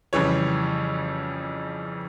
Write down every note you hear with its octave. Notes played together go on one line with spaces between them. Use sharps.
F2 C#3 E3 G3 C#5